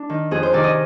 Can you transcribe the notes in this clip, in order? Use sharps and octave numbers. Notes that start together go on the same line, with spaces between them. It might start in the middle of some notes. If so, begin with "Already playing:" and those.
Already playing: D4
D#3
F2 G#4
C5
C3 D#3 D5
D#5